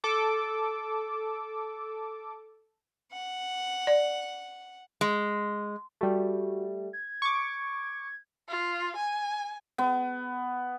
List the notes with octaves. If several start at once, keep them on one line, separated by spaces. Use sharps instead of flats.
A4 D6 E6
F#5
D5
G#3
G3 A3 F#4
G#6
C#6 D6
F4
G#5
B3